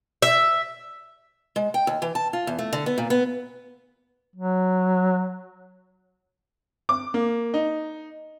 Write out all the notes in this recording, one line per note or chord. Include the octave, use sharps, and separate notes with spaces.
E5
G#3
G5
D#2
E3
A5
F4
E2
A3
D3
B3
A#2
B3
F#3
D6
A#3
D#4